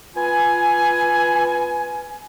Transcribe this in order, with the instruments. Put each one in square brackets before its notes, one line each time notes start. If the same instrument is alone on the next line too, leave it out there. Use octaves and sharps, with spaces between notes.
[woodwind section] B3 F4 G#5